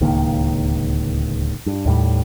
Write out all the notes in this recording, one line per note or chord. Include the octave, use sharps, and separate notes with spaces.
D1 C#2 D#3 A#3
G2
D#2 A2 G3